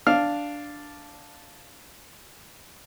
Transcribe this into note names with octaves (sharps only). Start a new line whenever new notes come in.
D4 F5 F6